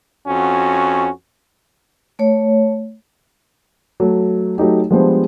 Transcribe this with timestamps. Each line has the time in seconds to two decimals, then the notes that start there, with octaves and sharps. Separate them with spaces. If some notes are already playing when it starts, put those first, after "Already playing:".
0.27 F2 C#4 F#4
2.19 A3 C#5
4.00 F#3 A3
4.58 F#3 A3 D#4 G4
4.90 F3 G3 G#3 B3 D4 C5